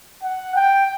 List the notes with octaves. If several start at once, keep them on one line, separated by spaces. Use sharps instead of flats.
F#5
G5